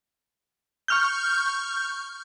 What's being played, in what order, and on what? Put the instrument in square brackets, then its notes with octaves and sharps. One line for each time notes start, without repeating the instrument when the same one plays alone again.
[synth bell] C#6 F6 G6